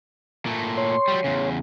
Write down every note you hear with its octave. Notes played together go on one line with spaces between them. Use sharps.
A#2 A3
C#5 C6
F#3 G3
E2 C#3